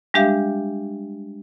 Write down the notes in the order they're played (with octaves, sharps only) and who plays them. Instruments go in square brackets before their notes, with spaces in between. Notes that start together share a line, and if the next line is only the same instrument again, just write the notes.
[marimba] G3 G#3 D4 G4 E5 F5